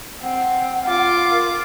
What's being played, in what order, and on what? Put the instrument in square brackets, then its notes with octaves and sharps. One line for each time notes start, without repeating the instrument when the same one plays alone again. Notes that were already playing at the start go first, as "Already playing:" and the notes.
[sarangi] C4 [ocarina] F#5
[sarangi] F4 [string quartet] D6
[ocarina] A#4